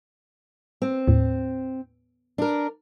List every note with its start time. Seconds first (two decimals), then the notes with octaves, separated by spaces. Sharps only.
0.82 C4
1.07 D#2 A2
2.38 D4 A#4